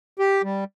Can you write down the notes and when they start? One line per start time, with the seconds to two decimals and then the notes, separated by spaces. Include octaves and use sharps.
0.19 G4
0.44 G3